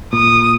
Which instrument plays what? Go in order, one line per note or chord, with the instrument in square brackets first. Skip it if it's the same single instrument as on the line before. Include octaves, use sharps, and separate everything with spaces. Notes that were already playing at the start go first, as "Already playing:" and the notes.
[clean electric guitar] A#2 [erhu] D#6